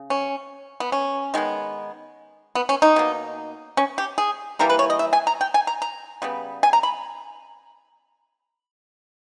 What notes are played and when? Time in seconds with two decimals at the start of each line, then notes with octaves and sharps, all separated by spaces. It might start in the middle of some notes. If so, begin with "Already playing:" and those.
Already playing: C#3
0.10 C#4
0.80 B3
0.92 C#4
1.34 D#3 G#3 B3
2.55 B3
2.69 C#4
2.82 D#4
2.96 B2 A#3
3.77 C#4
3.98 G4
4.18 G#4
4.59 E3 G3 A#3 A#4
4.70 B4
4.79 C#5
4.90 D#5
4.99 E5
5.13 G#5
5.27 A#5
5.41 G5
5.54 G#5
5.67 A#5
5.82 A#5
6.22 C#3 G3 B3
6.63 G#5
6.73 A#5
6.83 B5